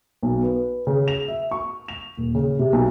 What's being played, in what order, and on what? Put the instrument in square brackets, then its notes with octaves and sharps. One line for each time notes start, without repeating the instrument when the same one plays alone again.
[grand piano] B1
B4
C#3
F7
E5
C#6
F7
D#1
C#3
C3
B1